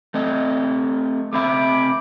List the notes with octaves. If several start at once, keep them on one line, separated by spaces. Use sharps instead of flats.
A3 C4 D#5
A3 C4 E5 B5 D6